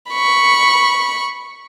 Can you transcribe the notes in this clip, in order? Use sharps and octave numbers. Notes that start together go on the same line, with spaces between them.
B5 C#6